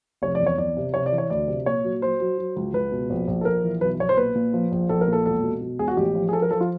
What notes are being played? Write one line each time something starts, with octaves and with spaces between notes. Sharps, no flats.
F1 C#5
D5
E2
C#5
E2 D5
C3
C3 C#5
D5
E3
C#5
D2 D5
C3
A#2 C#5
F#3
F#3 C5
F#3
F#3
C#2
C#2 B4
B2
A#1
A#1
A4
A#1 A#4
E3
B1 B4
B1 C#5
C5
A#2 B4
A#2
F3
A#1
A#1 A4
A#4
A#2 A4
E1 A4
B2
B2
E1 G#4
F#4
A1 G4
F3
G#4
F3 A4
A#4
F3 A4
F4